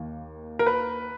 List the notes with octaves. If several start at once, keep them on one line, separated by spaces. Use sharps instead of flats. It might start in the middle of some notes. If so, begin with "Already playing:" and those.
Already playing: D#2 D#3 A#3
A#4
B4